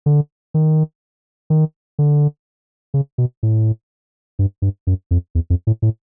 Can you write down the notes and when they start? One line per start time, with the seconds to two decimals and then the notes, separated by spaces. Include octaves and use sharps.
0.06 D3
0.54 D#3
1.50 D#3
1.99 D3
2.94 C#3
3.18 B2
3.43 A2
4.39 G2
4.62 G2
4.87 F#2
5.11 F2
5.35 E2
5.50 F2
5.67 A2
5.82 A2